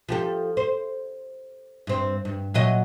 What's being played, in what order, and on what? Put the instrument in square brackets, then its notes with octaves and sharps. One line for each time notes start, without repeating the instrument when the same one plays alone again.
[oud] F3 G4 A4
C5
G2 C4
G2
A#2 F#3 D#5